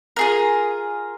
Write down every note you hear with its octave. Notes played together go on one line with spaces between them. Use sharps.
F4 G#4 A#4